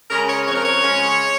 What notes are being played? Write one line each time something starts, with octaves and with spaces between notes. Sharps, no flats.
C#3 G#3 C#4 A#4
C#5
F2 C#5
A#4
C#5
C#3 G#3 C#4